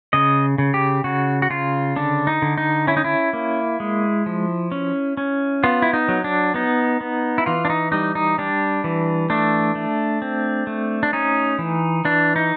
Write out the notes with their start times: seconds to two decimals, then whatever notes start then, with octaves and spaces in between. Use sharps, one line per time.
0.13 C#3 D#5
0.58 C#3
0.74 G4
1.04 C#3 F#4
1.42 F#4
1.50 C#3 F4
1.96 D3 D4
2.27 D#4
2.42 D3
2.58 D#4
2.87 C#4 E4
2.97 D#4
3.04 E4
3.33 A#3
3.80 G#3
4.26 F3
4.72 C#4
5.17 C#4
5.64 B3 F4
5.82 E4
5.93 D#4
6.08 F#3
6.24 D4
6.54 B3 D#4
7.01 B3
7.38 E4
7.46 E3 F4
7.65 D4
7.70 D#4
7.92 G3 D#4
8.15 D#4
8.38 G3 D4
8.84 E3
9.30 A3 D4
9.75 A3
10.22 C4
10.67 A3
11.03 D4
11.13 C#4 D#4
11.59 E3
12.05 E3 D4
12.36 D#4